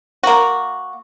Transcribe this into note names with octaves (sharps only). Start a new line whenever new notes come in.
A#3 F#4